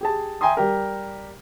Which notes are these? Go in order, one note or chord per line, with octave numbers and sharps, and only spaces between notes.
G4 G#4 A5
E5 G5 G#5 A#5 C6 D#6
G3 G4 A#4